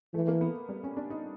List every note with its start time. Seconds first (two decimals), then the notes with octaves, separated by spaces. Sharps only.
0.14 E3 A3
0.28 A#3
0.41 B3
0.69 G3
0.84 C#4
0.97 D4
1.10 D#4